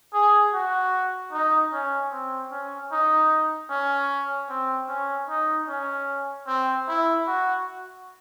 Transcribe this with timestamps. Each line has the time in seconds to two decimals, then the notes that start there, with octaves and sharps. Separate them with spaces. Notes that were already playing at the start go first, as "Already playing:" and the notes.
0.13 G#4
0.53 F#4
1.32 D#4
1.72 C#4
2.12 C4
2.51 C#4
2.92 D#4
3.70 C#4
4.49 C4
4.89 C#4
5.29 D#4
5.68 C#4
6.47 C4
6.88 E4
7.27 F#4